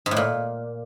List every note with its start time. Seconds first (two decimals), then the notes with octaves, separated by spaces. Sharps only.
0.06 G#2
0.11 A2
0.17 A#2